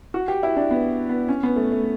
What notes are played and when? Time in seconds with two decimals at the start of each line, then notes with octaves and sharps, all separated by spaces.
0.14 F#4
0.28 G4
0.43 E4
0.56 D4
0.71 B3
1.09 B3
1.28 C#4
1.43 B3
1.56 A3
1.72 A3